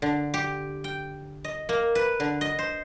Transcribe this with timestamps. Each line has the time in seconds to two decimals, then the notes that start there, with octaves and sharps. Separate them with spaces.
0.02 D3
0.34 G4
0.84 G5
1.44 D#5
1.69 A#3
1.95 B4
2.20 D3
2.41 D#5
2.59 C5